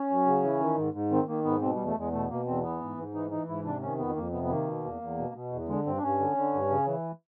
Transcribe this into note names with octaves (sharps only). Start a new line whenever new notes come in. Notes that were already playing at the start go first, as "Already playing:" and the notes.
Already playing: C#4
F#2
C#3
E3
D#3
G#2
G#2
D#3 C4
D#3 A#3
G#2 B3
B2 C4
G3
E2
A3
E2 G#3
B2 A3
B2 A#3
E2 C4
E3 B3
G#2
G#2
E3 D#4
E3 D#4
G#2 E4
C3 D4
D#3 C#4
F2 B3
F2 A#3
C3 B3
B3
D#3 A#3
B2
E2
E2
B2
B2
E2
D3 G#3
G2 C4
D4
G2 C#4
D3
D3
G2
C#3
E3